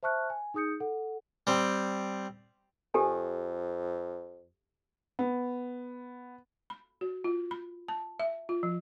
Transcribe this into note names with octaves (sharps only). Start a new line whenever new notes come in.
C5 E5 A5 C#6 F6 F#6
G#5
D#4 G#4 D#6 G6 C#7
A4 F#5
G3 C4
F2 G4 A4 G#5
B3
B5
F#4
F4
B5
A5
E5
F4
F3